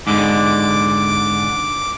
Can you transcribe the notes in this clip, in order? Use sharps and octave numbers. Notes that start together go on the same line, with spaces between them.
G#2 D3 D6